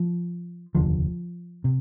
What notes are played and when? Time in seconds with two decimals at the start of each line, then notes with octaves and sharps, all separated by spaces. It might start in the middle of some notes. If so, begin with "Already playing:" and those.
Already playing: F3
0.75 F1 D#2 D3 F3
1.64 C3